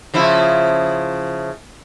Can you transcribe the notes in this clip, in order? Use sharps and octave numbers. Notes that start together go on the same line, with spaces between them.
C#3 F3 E4